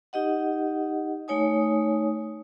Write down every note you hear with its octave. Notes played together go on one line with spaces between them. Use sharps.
D#4 G4 D#5 F#5
A3 D#4 C#5 G#5 D#6